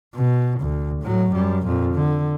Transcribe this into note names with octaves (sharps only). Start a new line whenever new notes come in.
B2
D2
A2 F#3
F#2 G3
F2 A#2
D3